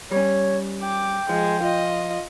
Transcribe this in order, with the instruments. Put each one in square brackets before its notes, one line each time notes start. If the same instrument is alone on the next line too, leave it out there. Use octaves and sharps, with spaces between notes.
[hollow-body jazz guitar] G3 C#4 [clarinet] C#5
[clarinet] G5 [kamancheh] D6
[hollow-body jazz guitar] F3 [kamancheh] G#3
[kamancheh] F4 D#5